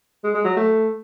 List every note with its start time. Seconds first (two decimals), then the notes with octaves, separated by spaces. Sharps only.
0.23 G#3
0.34 G#3
0.45 F#3
0.56 A3